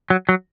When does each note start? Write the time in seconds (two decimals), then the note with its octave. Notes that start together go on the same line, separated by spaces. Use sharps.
0.10 F#3
0.29 F#3